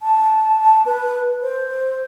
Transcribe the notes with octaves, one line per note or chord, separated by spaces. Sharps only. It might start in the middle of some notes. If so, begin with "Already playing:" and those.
A5
B4
C5